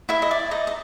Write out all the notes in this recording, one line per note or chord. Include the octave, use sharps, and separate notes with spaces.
E4 E5
D#5
D5
D#4 D#5
D#5